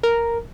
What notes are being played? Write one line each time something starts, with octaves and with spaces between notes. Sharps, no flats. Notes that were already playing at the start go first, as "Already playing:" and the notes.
A#4